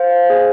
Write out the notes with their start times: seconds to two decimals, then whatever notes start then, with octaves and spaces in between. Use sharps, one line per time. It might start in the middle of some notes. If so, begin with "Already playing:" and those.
Already playing: C5 F5
0.30 G#4